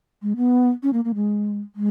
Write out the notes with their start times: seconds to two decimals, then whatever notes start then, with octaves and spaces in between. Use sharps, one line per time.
0.22 G#3
0.36 B3
0.83 C#4
0.93 A#3
1.05 A#3
1.15 G#3
1.76 G#3